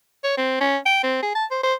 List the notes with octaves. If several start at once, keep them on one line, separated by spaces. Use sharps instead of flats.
C#5
C4
C#4
G5
C4
G#4
A5
C5
C5